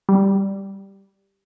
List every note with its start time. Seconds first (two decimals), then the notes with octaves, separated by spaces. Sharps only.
0.09 G3